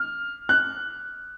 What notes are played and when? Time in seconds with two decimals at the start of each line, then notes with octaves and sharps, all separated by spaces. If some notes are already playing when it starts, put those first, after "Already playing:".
Already playing: F6
0.49 F#6